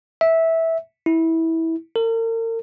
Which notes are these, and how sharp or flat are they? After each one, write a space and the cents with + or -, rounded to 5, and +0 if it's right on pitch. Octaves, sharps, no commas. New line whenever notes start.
E5 -15
E4 -20
A#4 -40